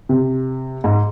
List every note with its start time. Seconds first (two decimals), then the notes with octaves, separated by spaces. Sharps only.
0.09 C3
0.84 G#2